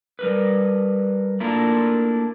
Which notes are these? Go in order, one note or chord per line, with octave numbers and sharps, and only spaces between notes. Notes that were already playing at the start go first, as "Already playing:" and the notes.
G3 A#4 B4
A3 A#3 D4 E4 F4 A#4